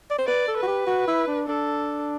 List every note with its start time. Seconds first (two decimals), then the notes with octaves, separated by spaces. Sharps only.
0.11 D5
0.19 C5
0.27 B4 D5
0.48 A4
0.57 B4
0.63 F#4
0.67 G4
0.87 F#4
1.08 E4
1.28 D4
1.48 D4 A4